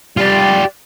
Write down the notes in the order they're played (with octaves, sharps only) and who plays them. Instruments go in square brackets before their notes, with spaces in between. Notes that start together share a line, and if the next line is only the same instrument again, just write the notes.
[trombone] G3 [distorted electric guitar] F4 G4 [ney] D5